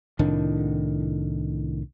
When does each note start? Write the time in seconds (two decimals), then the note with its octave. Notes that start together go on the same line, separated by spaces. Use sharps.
0.19 C2 A2 D#3 D4